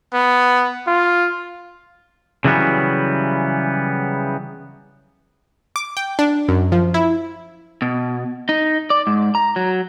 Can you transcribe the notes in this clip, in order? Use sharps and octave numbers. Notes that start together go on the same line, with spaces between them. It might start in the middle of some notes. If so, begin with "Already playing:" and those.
B3
F4
C#3 E3 F#3 G3 B3
D6
G5
D4
F#2
F3
E4
B2
D#4
D5
G#2
A#5
F#3